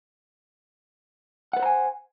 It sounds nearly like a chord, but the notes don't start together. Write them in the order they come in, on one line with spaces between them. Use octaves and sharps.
F#5 B4 C5 A#5 G#5